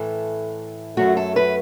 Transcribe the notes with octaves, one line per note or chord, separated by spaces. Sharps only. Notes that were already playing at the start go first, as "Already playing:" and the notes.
Already playing: A2 E3 A3 A4
F#2 F#3 A3 F#4
A4
B4